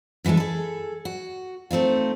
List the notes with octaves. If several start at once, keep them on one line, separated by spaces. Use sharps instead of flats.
F#2 E3 G3 G#3 A4
G#4 A4
F#4
A3 C4 D#4 F4